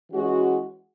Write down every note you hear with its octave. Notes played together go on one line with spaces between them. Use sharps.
E3 G#3 C#4 F#4